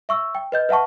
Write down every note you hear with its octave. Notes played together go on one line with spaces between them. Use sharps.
E5 C#6 E6
G5
B4 D#5 G6
B4 E5 F#5 A5 C#6